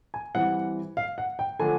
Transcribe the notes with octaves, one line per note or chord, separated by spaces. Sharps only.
G#5
E3 G3 C4 F#5
F5
F#5
G5
D3 F3 A3 D4 G#5